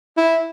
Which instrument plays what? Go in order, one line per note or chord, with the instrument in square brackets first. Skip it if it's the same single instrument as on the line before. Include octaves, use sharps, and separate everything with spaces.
[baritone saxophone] E4